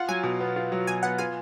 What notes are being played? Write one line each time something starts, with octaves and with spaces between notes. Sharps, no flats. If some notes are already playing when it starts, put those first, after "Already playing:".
Already playing: F4 F#5
F#3 G#5
B2
B3
F4
F#3
B2 G#5
B3 F#5
F4 G#5